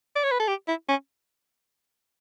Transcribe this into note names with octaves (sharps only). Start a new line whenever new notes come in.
D5
C#5
B4
A4
G4
E4
C#4